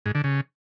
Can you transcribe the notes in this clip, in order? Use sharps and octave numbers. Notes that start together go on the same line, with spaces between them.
G#2
D3
C#3